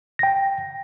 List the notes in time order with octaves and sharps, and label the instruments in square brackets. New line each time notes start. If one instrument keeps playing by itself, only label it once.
[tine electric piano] G5 A#6